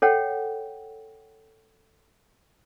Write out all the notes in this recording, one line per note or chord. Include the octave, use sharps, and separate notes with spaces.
A4 C#5 F#5 G5